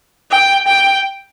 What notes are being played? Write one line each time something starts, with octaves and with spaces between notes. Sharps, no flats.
G5
G5